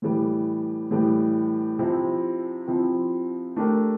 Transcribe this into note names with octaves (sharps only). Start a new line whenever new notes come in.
A2 E3 G3
A2 E3 G3
C3 F3 C4 E4
C3 F3 C4 E4
A3 D4 G4 A#4